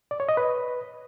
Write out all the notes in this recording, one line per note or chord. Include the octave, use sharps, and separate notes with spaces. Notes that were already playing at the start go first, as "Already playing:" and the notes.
D5
C#5
D#5
B4